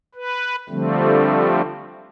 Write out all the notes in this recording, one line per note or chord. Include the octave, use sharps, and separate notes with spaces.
B4
D3 F3 G3 A3 C4